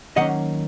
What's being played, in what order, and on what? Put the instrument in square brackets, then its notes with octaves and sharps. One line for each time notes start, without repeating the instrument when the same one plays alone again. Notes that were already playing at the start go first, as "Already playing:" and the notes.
[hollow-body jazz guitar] D#3 F#3 A#3 C#4 D#5 F#5